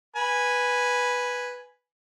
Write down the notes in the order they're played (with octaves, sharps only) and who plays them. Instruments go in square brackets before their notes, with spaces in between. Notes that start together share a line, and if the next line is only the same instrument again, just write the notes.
[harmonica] B4 G#5